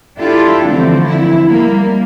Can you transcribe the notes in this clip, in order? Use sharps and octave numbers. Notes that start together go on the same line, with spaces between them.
D4 E4 F4 G4 A4
D3 E3 F3 A3 C4
E4
G3 A#3